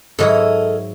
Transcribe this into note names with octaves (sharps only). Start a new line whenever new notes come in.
G#2 F#3 E4 A4 A#4 D#5